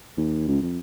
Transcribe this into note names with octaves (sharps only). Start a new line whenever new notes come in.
D#2
C#2
F2